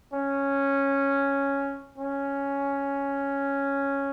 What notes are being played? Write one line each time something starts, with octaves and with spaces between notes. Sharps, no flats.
C#4
C#4